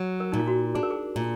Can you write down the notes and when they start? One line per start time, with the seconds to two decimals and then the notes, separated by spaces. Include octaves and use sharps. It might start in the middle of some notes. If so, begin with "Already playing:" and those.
Already playing: F#3
0.20 A#4
0.32 A#2 D#4
0.40 F4
0.48 F#4
0.75 D4 G#4
0.83 A#4
0.91 G#4
1.16 A#2